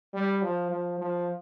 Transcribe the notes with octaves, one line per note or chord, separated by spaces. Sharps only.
G3
F3
F3
F3